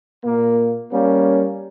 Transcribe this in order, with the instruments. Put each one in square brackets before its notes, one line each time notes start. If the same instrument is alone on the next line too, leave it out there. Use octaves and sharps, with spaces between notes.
[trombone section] A#2 A#3
G3 A#3 C#4